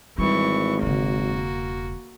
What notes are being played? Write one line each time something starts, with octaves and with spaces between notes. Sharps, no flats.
G#1 E3 G3 C#6
E1 C#3 A#3 F#4